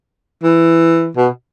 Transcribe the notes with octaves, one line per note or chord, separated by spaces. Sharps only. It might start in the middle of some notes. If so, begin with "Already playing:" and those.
E3
B2